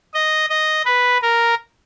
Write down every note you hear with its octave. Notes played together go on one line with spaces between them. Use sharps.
D#5
D#5
B4
A#4